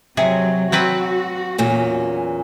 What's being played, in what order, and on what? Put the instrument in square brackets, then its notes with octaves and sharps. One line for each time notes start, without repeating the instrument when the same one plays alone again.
[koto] C3 G#4 [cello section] F#3
[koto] F#3 C4 B4 [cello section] F#4
[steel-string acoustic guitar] E2 A#2 C#4